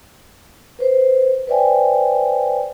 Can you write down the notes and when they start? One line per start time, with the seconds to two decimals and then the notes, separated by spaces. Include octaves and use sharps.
0.79 B4 C5
1.47 B4 C5 D5 E5 G5 G#5